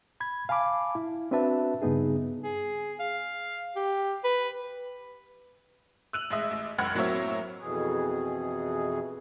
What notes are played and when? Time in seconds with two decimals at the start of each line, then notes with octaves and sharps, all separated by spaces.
0.20 B5 G#6
0.49 F5 G#5 A5 B5 D6
0.95 E4
1.31 C4 D4 F#4 B4 E5 A5
1.82 G2 C#3 B3 D#4 G#4
2.43 G#4
3.00 F5
3.76 G4
4.24 B4
6.13 E6 F#6 D#7 F7 F#7
6.30 A1 G#3 D#5 E5
6.51 A1
6.78 C#2 F#2 F#5 B5 F6 G#6
6.95 A2 F#3 A#3 C4 C#5 E5
7.58 F2 B2 E3 G#4